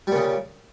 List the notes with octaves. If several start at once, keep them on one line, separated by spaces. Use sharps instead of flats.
A#2 C#3 G3